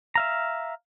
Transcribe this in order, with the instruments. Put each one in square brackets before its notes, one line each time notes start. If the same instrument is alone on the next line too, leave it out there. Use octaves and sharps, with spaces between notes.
[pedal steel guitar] E5 F5 A#5